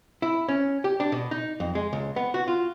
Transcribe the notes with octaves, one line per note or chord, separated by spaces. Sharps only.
E4
C#4
G4
D4
B2
D#4
F2
G#3
C#2
B3
F#4
F4